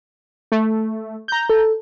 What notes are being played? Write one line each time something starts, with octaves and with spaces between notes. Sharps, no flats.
A3
A#5 G6
A4